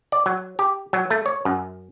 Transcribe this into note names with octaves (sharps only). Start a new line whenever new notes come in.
D5
F#3
G4
F#3
A3
C#5
F#2